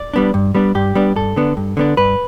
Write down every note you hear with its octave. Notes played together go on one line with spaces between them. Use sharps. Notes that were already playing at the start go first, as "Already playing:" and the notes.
Already playing: D5
G3 B3 D4
G2
G3 B3 D4
G2 G4
G3 B3 D4
G2 A4
D3 B3 D4
G2
D3 B3 D4
G2 B4